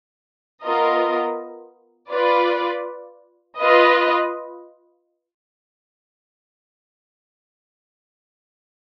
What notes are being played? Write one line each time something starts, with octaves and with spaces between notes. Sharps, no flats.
B3 F4 A#4 D#5
F4 B4 D5
F4 B4 D#5